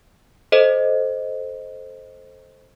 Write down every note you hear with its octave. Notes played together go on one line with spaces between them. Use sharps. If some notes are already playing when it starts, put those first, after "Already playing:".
A4 C5 D#5